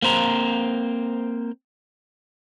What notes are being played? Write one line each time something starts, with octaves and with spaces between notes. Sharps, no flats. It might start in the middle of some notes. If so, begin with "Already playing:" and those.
A#3 C4 C5 A#5